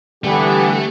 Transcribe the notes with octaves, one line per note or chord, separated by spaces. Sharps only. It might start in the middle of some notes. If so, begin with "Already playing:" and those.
D3 E3 G3 A3 B3 G4